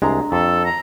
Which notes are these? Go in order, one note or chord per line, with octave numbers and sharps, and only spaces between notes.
C2 G#3 D4 A#5
F2 A4
A#5